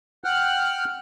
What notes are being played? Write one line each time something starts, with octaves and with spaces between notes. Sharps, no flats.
F#5 G5 F6 F#6